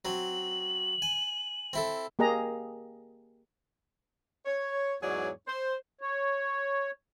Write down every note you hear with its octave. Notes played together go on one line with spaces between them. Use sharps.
F#3 C4 F#7
G#5
C4 E4 A4
A#3 G4 G#4 D#5 A#5
C#5
E2 G#2 F#3 G#4 C#5 D5
C5
C#5